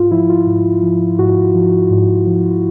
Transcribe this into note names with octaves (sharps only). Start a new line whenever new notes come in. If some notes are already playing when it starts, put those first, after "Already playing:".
Already playing: G#2 F4
F3 E4
F4
G#2
F3
G#2 F#4
F3
G#2
F3